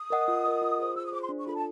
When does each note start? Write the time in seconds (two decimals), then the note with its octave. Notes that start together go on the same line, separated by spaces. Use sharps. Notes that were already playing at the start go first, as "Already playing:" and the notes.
Already playing: D#6
0.10 A#4 D#5 F#5
0.28 F4
0.44 A#4 D#5 F#5
0.62 F4
0.78 G#4 C5
0.96 F4 E6
1.05 D#6
1.12 G#4 C5 D6
1.21 C6
1.29 D4
1.38 C#6
1.46 F4 A4 B5
1.55 A5